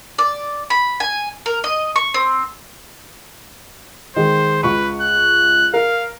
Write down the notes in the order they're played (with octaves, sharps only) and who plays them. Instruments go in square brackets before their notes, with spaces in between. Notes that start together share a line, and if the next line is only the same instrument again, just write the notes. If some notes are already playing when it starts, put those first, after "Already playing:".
[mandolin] D5
B5
G#5
A#4
D#5
C#6
C4
[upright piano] D#3 G#3 [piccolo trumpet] C5
[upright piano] C#2 C#6 [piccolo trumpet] B4
[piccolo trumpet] F#6
[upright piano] A#4 [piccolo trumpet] F5